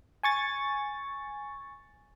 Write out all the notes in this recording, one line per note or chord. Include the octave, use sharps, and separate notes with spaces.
G#5 C#6 A6